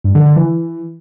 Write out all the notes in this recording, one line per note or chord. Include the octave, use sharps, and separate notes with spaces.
G2
D3
D3
E3